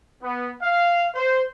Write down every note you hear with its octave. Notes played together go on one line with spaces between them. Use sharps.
B3
F5
C5